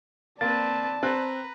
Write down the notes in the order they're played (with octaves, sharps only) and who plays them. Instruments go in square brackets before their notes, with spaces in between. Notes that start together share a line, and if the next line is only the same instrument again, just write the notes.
[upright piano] A#3 [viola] C4 B4 [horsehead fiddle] D5 A5 [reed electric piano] A6
[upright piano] C4 F#6 [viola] B4 A#5